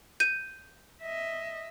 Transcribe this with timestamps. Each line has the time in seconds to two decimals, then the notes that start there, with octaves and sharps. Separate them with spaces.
0.20 G6 D#7
1.02 D#5 E5